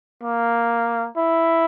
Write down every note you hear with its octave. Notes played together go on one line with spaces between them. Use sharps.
A#3
E4